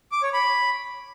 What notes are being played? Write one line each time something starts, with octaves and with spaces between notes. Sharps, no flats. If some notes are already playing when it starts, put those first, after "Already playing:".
D6
C#5
B5